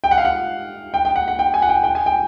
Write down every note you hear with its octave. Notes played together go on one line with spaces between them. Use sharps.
G5
F#5
F5
F#5
G5
G5
F#5
F#5
G5
G#5
F#5
G5
G5
G#5
G5